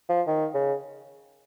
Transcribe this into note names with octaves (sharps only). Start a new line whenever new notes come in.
F3
D#3
C#3